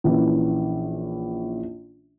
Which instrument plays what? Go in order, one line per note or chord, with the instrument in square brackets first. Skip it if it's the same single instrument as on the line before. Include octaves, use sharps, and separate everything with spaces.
[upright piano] A#1 E3 C#4